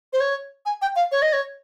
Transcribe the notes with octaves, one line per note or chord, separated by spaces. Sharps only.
C5
C#5
G#5
G5
F5
C#5
D#5
C#5